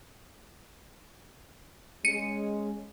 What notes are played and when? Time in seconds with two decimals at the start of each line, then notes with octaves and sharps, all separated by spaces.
2.05 G#3 C#4 C#7 D#7